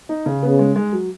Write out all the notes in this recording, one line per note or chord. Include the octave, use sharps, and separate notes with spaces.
D#4
C#3
C#3 B3
G#3
G#3
F#3